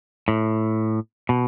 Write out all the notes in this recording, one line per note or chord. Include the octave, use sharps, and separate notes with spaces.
A2
B2